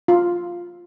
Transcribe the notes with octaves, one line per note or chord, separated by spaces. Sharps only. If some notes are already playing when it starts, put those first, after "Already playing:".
F4